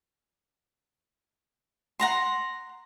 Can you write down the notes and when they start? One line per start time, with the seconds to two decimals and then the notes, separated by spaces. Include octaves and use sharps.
2.00 F#5 A#5 C6